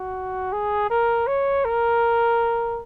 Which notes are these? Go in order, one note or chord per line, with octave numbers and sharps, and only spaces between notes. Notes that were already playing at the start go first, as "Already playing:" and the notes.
Already playing: F#4
G#4
A#4
C#5
A#4